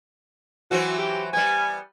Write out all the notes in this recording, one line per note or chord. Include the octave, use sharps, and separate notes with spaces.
E3 F#3 C4 F#4
G4
G3 B3 G#5